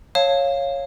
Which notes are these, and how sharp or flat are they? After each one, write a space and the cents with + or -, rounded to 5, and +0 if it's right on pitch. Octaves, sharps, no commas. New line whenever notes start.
C#5 -5 F5 +0 A5 +0